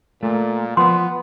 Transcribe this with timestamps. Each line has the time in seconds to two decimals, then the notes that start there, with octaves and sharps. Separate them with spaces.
0.23 A#2 A3
0.77 F3 B3 C6